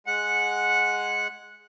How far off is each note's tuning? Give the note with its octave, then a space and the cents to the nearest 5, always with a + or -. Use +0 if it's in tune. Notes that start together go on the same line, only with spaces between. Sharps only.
G#3 +0 F#5 -10